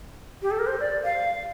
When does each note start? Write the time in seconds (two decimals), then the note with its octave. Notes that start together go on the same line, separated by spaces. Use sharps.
0.42 G4
0.51 A4
0.59 A#4
0.67 C5
0.80 D5
1.04 F5